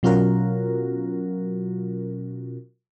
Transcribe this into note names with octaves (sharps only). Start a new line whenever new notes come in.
B2 F#3 C#4 F4 F#4 A#4